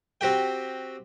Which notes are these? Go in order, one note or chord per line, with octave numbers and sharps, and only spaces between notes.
C4 F#4 G4 G5